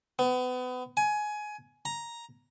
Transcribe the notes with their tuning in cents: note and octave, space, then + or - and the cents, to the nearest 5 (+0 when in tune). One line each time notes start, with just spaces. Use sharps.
B3 +30
G#5 +20
A#5 +5